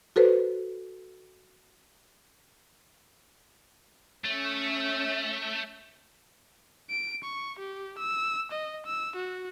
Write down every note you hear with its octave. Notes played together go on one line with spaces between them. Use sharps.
F#4 A4 B4 C5
A3 C#4 E5
D7
C#6
G4
E6
D#5
E6
F#4